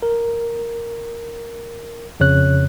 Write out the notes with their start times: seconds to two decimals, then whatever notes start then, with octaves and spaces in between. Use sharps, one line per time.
0.02 A#4
2.20 F2 C#3 C#5 F#6